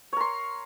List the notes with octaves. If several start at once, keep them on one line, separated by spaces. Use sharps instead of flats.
A#4 C#5 C6